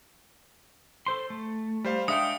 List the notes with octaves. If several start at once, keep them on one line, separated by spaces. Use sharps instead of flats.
A4 C5 C6
A3
G3 C5 F5
G#3 D4 E5 F5 G5 D#6 C#7